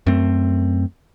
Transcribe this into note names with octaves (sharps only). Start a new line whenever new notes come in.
F#2 A3 C4